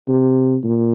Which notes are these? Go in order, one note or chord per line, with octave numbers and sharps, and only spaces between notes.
C3
A#2